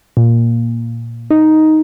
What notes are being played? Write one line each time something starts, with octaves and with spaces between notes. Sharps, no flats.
A#2
D#4